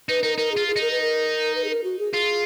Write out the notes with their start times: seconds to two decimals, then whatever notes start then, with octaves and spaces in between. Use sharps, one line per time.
0.09 D#4 B4
0.23 D#4 A#4
0.37 D#4 A#4
0.52 F4 G#4
0.68 G#4
0.76 D#4 A#4
0.91 B4
1.01 A#4
1.55 B4
1.64 G#4
1.69 A#4
1.84 F#4
1.99 G#4
2.13 F4 G#4